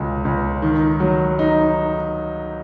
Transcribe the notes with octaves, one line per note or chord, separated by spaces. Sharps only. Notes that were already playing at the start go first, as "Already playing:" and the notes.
Already playing: C#2 B2 G#3
C#2
D#3
F#3
D#4